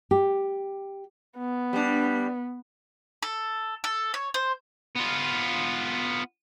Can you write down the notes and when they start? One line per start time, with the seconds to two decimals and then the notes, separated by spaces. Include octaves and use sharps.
0.11 G4
1.38 B3
1.73 G3 D4
3.22 A4
3.84 A4
4.14 C#5
4.34 C5
4.95 B3 F4